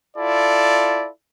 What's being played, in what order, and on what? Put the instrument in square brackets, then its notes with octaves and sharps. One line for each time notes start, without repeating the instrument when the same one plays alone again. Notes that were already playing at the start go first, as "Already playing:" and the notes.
[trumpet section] E4 F4 A4 D5